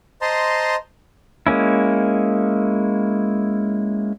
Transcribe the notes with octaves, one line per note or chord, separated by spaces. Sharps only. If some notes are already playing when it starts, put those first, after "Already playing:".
C5 D#5 A5 A#5 C6
G#3 A#3 C#4 E4